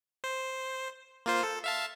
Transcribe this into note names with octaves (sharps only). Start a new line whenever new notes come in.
C5
A#3 F4 C5
A4
E5 F5 A5